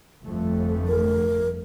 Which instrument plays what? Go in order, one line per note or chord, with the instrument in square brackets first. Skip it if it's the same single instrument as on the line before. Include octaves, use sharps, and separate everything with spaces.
[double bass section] G1 F2 A3
[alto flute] A#4